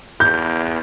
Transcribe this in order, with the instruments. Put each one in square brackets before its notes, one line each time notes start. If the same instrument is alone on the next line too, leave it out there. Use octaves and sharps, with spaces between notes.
[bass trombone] E2 [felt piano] G6